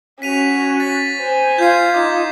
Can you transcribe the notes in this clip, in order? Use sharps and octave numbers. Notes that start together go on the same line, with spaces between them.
C#4 F#4 B6 D#7 F7
A6 B6
C5 G#5
F4 G6 G#6 C7
D#4 D6 G6